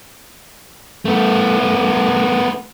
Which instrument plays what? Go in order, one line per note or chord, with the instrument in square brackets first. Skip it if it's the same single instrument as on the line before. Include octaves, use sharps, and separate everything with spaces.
[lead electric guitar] A3 B3